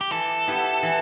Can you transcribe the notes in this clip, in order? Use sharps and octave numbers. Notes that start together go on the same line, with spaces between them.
G4
E3 A4
B3 E4 G4 B4
E3